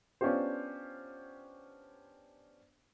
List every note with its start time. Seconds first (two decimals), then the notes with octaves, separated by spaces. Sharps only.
0.21 B3 C#4 D4 F4 G4 C5